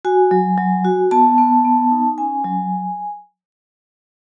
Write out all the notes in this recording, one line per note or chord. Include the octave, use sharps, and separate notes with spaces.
F#4 G#5
F#3
F#3
F#4
B3 A5
B3
B3
D#4
C#4 G#5
F#3